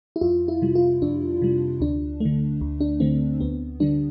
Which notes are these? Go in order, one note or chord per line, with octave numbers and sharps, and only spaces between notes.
E4
F2 F4
E4
C3 G3
F4
F2 D4
C3 G3
D2 D4
D3 A3
D2
D4
D3 A3 C4
D2 B3
D3 G3 D4